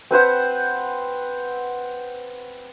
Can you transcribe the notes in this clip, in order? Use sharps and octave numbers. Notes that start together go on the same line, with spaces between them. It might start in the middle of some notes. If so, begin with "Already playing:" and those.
C4 B4 C5 F#5